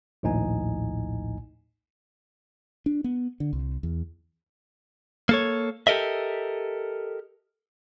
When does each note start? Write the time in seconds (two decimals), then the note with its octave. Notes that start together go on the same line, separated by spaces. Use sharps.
0.23 A#1 D#2 A2 D#4 G#5
2.86 D4
3.04 B3
3.40 D3
3.53 C2
3.83 E2
5.29 A#3 A4 C#5
5.87 G4 A4 A#4 D#5 E5